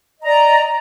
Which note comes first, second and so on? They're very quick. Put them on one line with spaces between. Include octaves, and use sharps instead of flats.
D#5 A#5 D5